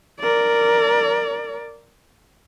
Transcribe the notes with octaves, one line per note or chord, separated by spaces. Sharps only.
A#4 D5